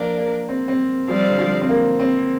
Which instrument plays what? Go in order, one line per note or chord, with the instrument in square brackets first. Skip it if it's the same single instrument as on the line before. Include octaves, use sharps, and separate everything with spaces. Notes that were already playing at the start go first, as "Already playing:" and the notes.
Already playing: [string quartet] F3 D4 A#4 D5 [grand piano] A#3
[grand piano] A#3
C4
C4
[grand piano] F3 [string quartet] G3 C4 G4 D5 F5
[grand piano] D3
F3
C4
A#3
C4